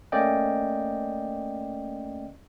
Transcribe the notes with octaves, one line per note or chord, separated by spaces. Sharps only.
A3 A#3 C#4 D5 D#5 G5